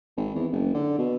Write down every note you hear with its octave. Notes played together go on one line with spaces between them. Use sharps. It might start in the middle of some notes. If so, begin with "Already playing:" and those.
G#1
E2
F#1
D3
B2